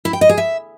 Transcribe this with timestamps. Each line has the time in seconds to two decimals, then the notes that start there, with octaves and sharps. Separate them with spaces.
0.05 E4
0.13 G5
0.21 D#5
0.29 G#4
0.38 E5